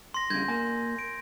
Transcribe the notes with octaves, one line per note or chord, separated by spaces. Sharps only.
C6 A#6
G2 C#3 G6 G#6
A#3 G#5
D7